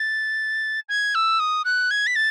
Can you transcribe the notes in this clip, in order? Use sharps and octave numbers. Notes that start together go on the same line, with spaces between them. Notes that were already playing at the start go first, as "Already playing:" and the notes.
Already playing: A6
G#6
E6
D#6
F#6
G#6
B6
A6